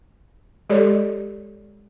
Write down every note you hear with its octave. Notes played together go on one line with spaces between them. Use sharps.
G#3 G4 A4 C#5 D5